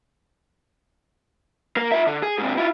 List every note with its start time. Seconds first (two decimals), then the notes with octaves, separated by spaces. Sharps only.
1.76 A#3 A#4
1.92 F4 E5
2.07 D3
2.23 G#4
2.38 G#2 C3
2.57 E4 F4